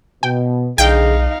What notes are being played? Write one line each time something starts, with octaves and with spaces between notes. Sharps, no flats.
B2 G5
B1 D3 D#4 G#4 F5 G5